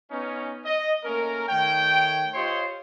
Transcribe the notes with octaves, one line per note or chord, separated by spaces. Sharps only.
B3 C#4 D#4
D#5
A3 A#3 C#4 A#4
D#3 A3 C#5 G5
F4 G4 C5 C#5 D#5 C6